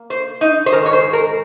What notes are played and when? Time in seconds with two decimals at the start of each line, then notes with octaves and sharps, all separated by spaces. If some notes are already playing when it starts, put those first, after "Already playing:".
Already playing: A#3
0.10 C5
0.41 D#4
0.66 C5
0.72 G#2 D#3 G#3 A#4
0.86 C#5
0.93 C5
1.13 A#4